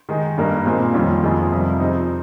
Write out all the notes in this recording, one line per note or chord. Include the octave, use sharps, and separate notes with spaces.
D#3 G#3 D#4
G2 G3 A#3 D#4 A#4
A#2 G#3 C4
F2 D#3 G3 C#4 F4
F2 D#3 G#3 C4 F4
F2 C3 G3
F3 C4 D#4 G#4